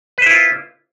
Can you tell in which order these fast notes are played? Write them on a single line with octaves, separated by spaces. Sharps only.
B4 C5 E4 F4